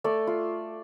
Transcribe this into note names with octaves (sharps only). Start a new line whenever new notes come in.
A3 D5
F4